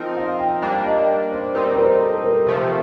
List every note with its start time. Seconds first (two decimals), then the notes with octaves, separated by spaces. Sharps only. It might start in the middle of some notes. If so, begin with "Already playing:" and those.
Already playing: F3 C4 D#4 A#4
0.17 F5
0.39 G5
0.62 G3 A#3 D4 G5
0.86 D#5
1.32 C5
1.55 G3 C4 D#4 A#4
1.73 C5
1.78 A#4
2.01 A4
2.24 A#4
2.47 C3 F3 A3